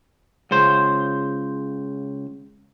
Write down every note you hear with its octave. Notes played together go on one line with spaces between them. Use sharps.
C#2 C#3 C5